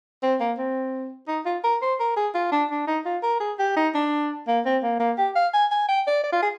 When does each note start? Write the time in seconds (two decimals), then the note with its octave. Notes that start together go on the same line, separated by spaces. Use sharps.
0.23 C4
0.40 A#3
0.58 C4
1.28 D#4
1.46 F4
1.64 A#4
1.82 C5
2.00 A#4
2.16 G#4
2.35 F4
2.52 D4
2.71 D4
2.87 D#4
3.05 F4
3.23 A#4
3.40 G#4
3.59 G4
3.76 D#4
3.95 D4
4.48 A#3
4.65 C4
4.83 A#3
5.00 A#3
5.18 G4
5.36 F5
5.54 G#5
5.71 G#5
5.88 G5
6.07 D5
6.24 D5
6.32 F4
6.42 G#4